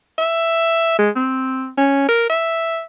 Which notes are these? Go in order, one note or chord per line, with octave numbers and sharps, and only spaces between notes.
E5
G#3
C4
C#4
A#4
E5